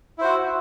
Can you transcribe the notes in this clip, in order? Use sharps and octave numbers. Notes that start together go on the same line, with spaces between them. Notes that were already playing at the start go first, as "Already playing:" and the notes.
E4 F#4 C5